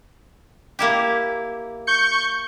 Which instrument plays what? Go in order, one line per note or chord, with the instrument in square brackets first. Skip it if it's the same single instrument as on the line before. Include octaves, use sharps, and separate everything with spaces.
[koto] A#3 E4 G4
[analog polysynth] C#6 G6 C#7